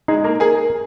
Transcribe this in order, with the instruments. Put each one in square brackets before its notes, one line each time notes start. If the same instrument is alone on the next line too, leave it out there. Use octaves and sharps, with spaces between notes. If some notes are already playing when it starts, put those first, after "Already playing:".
[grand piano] G#3 G#4 [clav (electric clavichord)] D#4
[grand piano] A#3 A#4
[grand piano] G#4 G#5 [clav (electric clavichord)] A#4